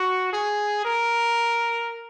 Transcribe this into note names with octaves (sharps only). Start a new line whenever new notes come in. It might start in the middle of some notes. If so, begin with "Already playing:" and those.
Already playing: F#4
G#4
A#4